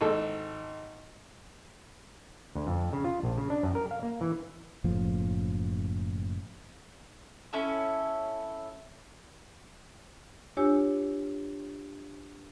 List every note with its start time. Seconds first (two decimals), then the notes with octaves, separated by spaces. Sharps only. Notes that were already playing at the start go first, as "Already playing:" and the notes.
0.01 G#1 A4
2.55 D2
2.67 F2
2.93 C#3
3.04 F4
3.23 A#1
3.38 C#3
3.50 D4
3.63 F#2
3.75 A#4
3.91 F5
4.03 A#3
4.21 E3
4.84 F#1 A2 F3
7.53 C#4 E4 A4
10.57 D4 F4 G4 C#5 G#5 E6